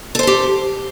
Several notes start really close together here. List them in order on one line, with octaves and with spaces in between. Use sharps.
A4 C5 A5 G4